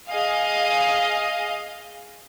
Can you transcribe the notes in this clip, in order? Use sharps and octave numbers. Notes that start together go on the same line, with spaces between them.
G#4 D#5 F5